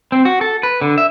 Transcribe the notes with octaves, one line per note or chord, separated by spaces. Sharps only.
C4
F#4
A4
B4
D3
E5